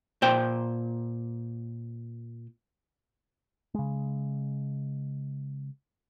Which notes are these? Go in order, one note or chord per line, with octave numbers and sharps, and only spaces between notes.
A#2 C5 G5
C#3 G#3